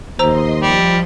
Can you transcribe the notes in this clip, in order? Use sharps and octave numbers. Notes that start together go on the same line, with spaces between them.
D#2 C5 D#5 A#5 C6 E6
F3 G3